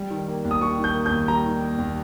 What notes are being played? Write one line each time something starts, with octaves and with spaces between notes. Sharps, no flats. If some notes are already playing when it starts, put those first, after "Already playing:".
Already playing: G3
D#3
A#3
D#2
D#6
G3 C#6
D#3
G6
A#3
G6
D#2
G3 A#5
D#3
A#3
D#2